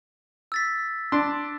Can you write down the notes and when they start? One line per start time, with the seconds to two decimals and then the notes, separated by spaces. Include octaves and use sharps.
0.52 E6 A6 B6
1.12 D4 C6